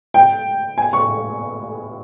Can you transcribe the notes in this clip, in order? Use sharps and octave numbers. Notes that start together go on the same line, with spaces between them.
G5
G#5
C#6